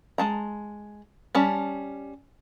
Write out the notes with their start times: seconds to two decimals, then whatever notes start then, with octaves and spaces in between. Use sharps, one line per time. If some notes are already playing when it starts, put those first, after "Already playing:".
0.18 G#3 A5 A#5
1.35 G3 C#4 A5